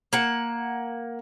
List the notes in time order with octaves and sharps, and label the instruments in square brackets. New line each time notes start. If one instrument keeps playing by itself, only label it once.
[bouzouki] A#3 F#5